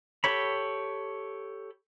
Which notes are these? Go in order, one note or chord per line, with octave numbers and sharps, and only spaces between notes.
G4 A4 C#5 B5